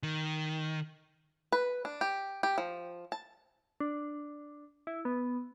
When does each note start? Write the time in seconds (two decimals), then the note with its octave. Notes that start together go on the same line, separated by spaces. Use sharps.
0.03 D#3
1.52 B4
1.85 D4
2.01 G4
2.43 G4
2.58 F3
3.12 A5
3.80 D4
4.87 E4
5.05 B3